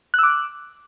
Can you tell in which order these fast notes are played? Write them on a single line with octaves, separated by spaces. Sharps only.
F#6 E6 D6